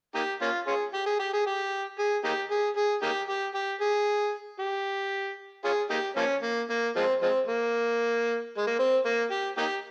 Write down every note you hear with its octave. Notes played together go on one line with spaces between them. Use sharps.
A#3 D#4 G4
A#3 C#4 F4
C#4 F4 G#4
G4
G#4
G4
G#4
G4
G#4
A#3 D#4 G4
G#4
G#4
A#3 D#4 G4
G4
G4
G#4
G4
C#4 F4 G#4
A#3 D#4 G4
F3 A#3 C#4
A#3
A#3
F3 G#3 C4
F3 G#3 C4
A#3
G#3
A#3
C4
A#3
G4
A#3 D#4 G4